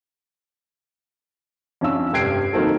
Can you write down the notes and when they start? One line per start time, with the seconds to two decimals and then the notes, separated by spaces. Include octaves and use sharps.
1.81 F2 C#4 D4 F5 E6
2.13 F1 G2 G5 G#6 C7 D7
2.53 D#3 F#3 A#3 C4 A4